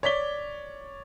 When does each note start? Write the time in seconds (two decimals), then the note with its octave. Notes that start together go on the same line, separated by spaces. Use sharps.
0.03 C#5 D5 B6 G7